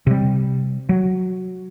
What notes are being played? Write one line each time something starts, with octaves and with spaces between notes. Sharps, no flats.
C3 G3
F#3